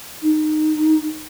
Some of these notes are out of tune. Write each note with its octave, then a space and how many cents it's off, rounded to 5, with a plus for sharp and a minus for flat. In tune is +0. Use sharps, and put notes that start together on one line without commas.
D#4 -15